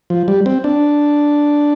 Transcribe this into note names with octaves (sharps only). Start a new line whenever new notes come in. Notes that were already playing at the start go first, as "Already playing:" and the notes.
F3
G3
C4
D4